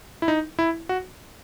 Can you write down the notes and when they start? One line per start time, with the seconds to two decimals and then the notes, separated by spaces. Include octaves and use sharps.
0.22 E4
0.28 D#4
0.59 E4
0.89 F#4